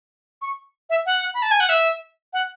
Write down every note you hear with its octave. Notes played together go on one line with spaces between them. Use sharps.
C#6
E5
F#5
B5
A5
G#5
F#5
E5
F#5